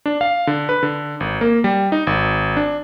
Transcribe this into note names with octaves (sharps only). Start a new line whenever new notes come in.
D4
F5
D3
B4
D3
G#1
A#3
G3
D#4
G#1
D4